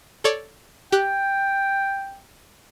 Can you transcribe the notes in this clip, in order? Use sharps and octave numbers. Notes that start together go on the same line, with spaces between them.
A4 C#5 D5
G4 G5 F#6